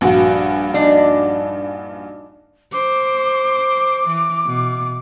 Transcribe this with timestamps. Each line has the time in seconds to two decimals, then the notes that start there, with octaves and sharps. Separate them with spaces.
0.01 A#1 G2 F#4
0.74 D4 D#4
2.73 C5 D6
4.07 E3
4.46 B2